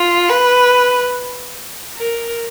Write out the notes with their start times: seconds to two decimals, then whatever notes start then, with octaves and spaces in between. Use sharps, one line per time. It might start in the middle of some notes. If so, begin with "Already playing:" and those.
Already playing: F4
0.29 B4
1.97 A#4